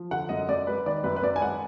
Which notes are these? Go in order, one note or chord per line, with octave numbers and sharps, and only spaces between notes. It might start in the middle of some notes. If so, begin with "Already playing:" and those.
Already playing: F3
D3 F#5
F#2 D#5
F#2 D5
G#3 B4
D#3 D5
F#2 B4
B4
F#2 D5
G#5
G#3 F#5